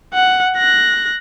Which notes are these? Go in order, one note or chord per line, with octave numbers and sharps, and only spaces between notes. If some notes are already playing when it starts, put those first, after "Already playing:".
F#5
F#6 A#6